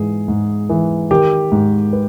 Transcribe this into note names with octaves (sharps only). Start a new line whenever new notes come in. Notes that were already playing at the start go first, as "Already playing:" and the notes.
Already playing: G#2 E3 G#4
G#2
E3
D#3 G4
G#2
B4